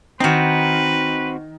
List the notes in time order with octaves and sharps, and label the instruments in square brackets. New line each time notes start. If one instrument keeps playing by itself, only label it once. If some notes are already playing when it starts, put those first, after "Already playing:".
[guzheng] D#3 D#4 [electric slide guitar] C4 F#4 [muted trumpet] B4